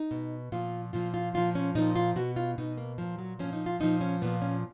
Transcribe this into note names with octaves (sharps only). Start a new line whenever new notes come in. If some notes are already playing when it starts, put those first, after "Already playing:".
Already playing: D#4
B2
A#2 F3 F4
A#2 F3 F4
F4
A#2 F3 F4
C#4
A#2 F3 D#4
F4
B2 F#4
F4
B2 D#4
A#3
A#2 F3
F#3
A#2 F3 C#4
D#4
F4
A#2 F3 D#4
C#4
A#2 F3 B3
C#4